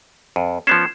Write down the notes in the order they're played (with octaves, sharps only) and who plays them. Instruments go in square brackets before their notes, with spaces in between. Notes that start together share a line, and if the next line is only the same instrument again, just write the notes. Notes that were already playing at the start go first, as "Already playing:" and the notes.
[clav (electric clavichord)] F2
[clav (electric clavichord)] F3 B3 C#4 [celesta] G#6 C7 E7